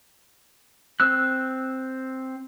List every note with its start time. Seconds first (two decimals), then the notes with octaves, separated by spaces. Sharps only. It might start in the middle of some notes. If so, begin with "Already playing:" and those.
1.00 C4 E6 F#6